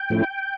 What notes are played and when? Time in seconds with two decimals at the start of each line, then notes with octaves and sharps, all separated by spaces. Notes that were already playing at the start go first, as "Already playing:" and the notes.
Already playing: G5
0.10 A2 F3 A3 C#4 E4